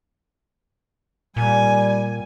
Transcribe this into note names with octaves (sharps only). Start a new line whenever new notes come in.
A#2 G3 G#5